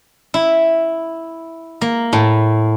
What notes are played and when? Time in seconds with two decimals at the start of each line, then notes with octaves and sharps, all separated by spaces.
0.34 E4
1.81 A#3
2.13 A2